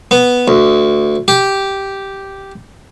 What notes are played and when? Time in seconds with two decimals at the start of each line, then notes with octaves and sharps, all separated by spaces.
0.11 B3
0.48 D2
1.28 G4